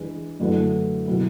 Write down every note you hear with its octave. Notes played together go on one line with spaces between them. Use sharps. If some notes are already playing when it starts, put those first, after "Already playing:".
Already playing: E3 G#3 D4 G#4 B4
F#2 D3 A3 E4 B4
B2 F#3 B3 E4 B4